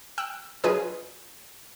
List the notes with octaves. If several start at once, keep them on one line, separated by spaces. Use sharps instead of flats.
G5 E6 F#6
F#3 D4 F4 G#4 B4 D#5